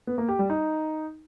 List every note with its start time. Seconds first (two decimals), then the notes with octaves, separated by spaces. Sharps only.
0.07 B3
0.18 A#3
0.29 G4
0.39 G3
0.50 D#4